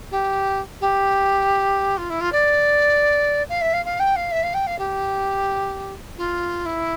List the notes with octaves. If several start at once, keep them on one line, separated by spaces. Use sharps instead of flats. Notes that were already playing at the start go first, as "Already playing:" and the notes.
G4
G4
F4
E4
F4
D5
F5
E5
F5
F5
G5
F5
E5
F5
G5
F5
G4
F4
E4